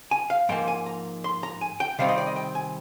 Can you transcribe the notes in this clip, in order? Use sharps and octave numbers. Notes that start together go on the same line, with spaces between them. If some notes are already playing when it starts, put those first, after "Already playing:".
G#5
F5
G#2 F3 A#3 G5
G#5
A#5
C6
A#5
G#5
G5
C3 D#3 G3 C4 F5
D#5
D5
D#5
G5
G#5